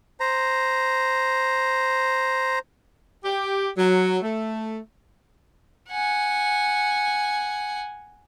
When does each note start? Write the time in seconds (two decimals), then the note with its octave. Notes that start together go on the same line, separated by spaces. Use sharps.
0.20 C5 A#5
3.24 G4
3.77 F#3
4.22 A3
5.89 F#5 G#5